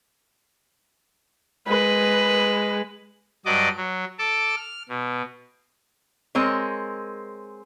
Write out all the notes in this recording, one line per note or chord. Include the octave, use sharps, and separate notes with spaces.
G#3 B4
G2 F#3 D5 D#5 D6
F#3
A4 A5 D6
F6
B2
G#3 C4 A#4 C#5